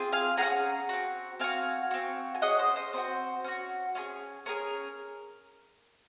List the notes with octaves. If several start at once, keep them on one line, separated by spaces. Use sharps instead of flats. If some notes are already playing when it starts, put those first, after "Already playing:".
Already playing: C4 F4 G#4
F5 G#5
C#4 F4 G#4 F#5 A#5
C4 F#4
C4 F#4 F5 G#5
C4 F#4
G#5
C#4 G#4 D#5 F#5
C5 D#5
C5 D#5
C4 D#4 F#4 C5
C#4 F#4
C#4 F4 G#4
C#4 G#4 A#4